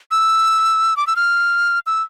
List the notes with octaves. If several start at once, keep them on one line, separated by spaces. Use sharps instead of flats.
E6
D6
E6
F6
E6